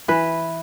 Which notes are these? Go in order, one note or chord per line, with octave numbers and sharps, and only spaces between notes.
E3 B4